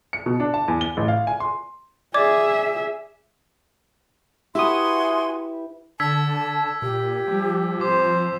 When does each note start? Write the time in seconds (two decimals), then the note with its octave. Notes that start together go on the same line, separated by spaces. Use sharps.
0.13 C#7
0.26 B2
0.40 D4
0.54 A5
0.68 E2
0.81 G7
0.97 A1
1.08 F5
1.27 G#5
1.40 C6
2.14 G#4 D5 E5 D6 G#6
4.55 E4 F#4 G4 B4 E5 G#5 C6 D#6
6.00 D3 A5 E6 G#6 B6
6.82 A#2 G4
7.27 F3 G3
7.81 C4 C5 D6